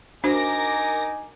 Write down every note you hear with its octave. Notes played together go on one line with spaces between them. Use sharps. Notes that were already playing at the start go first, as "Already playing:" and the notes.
D4 D#4 F#4 A#4 C5 G#5 D6 A#6